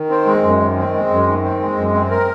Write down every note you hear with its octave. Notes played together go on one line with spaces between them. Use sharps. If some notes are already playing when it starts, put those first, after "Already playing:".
Already playing: D#3
C4
G#3
F#2
D#3
C4
G#3
F#2
D#3
C4
G#3
F#2
C4
A#4